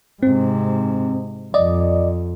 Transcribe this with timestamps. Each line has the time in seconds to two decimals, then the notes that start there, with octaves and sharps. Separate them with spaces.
0.23 G#2 C3 C4
1.54 F2 D5 D#5